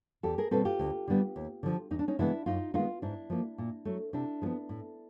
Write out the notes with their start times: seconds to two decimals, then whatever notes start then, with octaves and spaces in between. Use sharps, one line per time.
0.23 E2 G4 A4
0.38 G#4 A#4
0.51 B2 G3 C4 A4 B4
0.65 F4 G4
0.79 D2
1.07 D3 G3 B3
1.36 D#2
1.63 D3 F3
1.91 E2 D#4
1.99 D4
2.08 C#4 D#4
2.19 C#3 E3 G#3 B3 D4 E4
2.46 F#2 D#4 F4
2.74 D#3 G#3 B3 D#4 F4
3.02 G#2 D4 E4
3.30 F3 A#3
3.58 A#2
3.85 F#3 A3
4.13 C3 D4 E4
4.42 F3 G#3
4.46 B3
4.69 A2